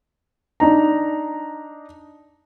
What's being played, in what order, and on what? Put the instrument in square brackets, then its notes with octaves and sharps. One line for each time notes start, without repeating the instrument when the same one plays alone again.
[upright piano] D4 D#4 A#5